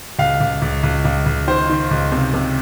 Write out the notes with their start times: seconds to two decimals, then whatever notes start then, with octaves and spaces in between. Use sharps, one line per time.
0.19 C#2 F5
0.41 C#2
0.62 C#2
0.83 C#2
1.05 C#2
1.26 C#2
1.47 D#3 C5
1.69 D#3
1.91 C#2
2.12 C3
2.34 C3